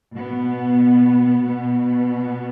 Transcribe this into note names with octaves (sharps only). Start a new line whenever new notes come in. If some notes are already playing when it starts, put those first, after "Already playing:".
B2 B3
B2 B3